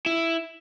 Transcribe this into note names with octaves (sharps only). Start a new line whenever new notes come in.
E4